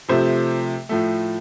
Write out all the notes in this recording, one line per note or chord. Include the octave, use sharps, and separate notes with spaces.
C3 F3 A3 C5
A2 F3 A3